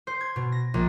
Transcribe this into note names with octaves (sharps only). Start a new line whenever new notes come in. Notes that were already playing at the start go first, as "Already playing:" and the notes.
C5
G#6
B2
A#6
A#1